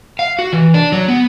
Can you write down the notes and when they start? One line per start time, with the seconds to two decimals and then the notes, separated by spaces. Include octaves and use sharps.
0.19 F5
0.39 F#4
0.52 E3
0.74 D4
0.92 F#3
1.08 B3